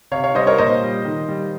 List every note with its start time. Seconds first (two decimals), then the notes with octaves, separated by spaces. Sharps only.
0.11 C3 C#5 F5
0.23 C#5 F5
0.35 G3 C5 D#5
0.47 A#4 C#5
0.58 A#2 C5 D#5
0.82 G3
1.05 D#3
1.28 G3